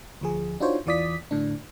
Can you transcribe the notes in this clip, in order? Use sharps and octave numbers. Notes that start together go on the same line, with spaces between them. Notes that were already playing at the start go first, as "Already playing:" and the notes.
D2 F3 G#4
D4 D#4 F4 F#4 C5 C#5
E2 E3 F4 D5 D#6 B6
A2 D3 D4